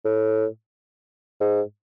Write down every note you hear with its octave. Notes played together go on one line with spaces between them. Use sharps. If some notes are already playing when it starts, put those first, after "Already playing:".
A2
G#2